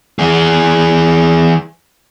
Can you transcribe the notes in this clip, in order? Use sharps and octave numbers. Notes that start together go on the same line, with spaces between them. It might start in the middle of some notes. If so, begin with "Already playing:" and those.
E3 G#4